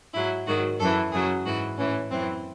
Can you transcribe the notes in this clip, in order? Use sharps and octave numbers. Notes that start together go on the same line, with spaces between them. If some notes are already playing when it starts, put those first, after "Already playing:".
G#2 F#3 E4
G#2 D#3 F#3 F#4
F#2 E3 A4
F#2 C#3 F#3 G#4
G#2 E3 F#4
A2 E3 C#4
F#2 E3 C4